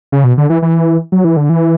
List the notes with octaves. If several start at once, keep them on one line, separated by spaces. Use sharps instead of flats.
C#3
B2
D3
E3
E3
F#3
E3
D3
E3